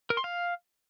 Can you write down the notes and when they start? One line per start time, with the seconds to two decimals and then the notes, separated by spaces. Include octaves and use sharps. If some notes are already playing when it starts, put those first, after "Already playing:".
0.10 A#4
0.17 C6
0.24 F5